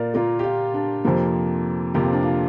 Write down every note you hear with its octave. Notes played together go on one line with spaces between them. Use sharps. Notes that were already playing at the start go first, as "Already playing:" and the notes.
Already playing: A#2 A#3 A#4 D5 F5
A#2 A#3 F4 A#4
G4
F4
D4
F2 C3 F3 A#3
F2 C3 F3 A#3 G4
F4
D4
F4